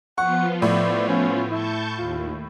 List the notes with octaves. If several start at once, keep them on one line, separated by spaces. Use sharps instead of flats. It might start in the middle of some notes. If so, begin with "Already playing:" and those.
F3 B3 F4 F#5 C#6
A2 D5
C#4
E4 A5 C#6 G6
D#2 F4